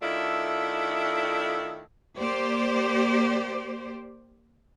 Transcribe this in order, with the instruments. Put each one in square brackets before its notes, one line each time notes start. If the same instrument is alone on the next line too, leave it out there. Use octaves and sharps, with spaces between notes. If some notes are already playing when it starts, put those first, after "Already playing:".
[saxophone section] D#3 A3 D4 E4 F4 A4
[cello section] A#3 G4 C5 D5